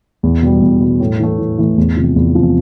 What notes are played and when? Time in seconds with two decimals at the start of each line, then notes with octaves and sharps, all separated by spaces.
0.23 E2
0.42 B2 G3
0.62 E2
0.80 B2 G3
1.00 A2
1.19 E3 A3
1.38 A2
1.58 E3 A3
1.78 E2
1.97 C3 F3
2.16 E2
2.35 C3 F3